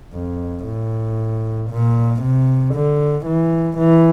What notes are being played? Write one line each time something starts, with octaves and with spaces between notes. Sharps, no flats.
F2
A2
A#2
C3
D3
E3
E3